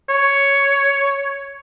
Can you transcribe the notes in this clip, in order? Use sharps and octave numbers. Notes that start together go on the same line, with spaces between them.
C#5